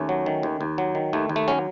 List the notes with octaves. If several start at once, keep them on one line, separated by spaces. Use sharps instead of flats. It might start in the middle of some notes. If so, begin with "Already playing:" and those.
Already playing: D#2 A3 C#4
F#3
D#3
D#2
D#2
F#3
D#3
D#2 A3
D#2
A3
F#3 C#4